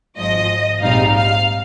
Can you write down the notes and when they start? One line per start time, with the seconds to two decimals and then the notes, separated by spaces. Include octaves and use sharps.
0.18 G#1 G#2 F3 D#5
0.81 A#1 G#2 G3 C4 D#4 F5
1.14 F5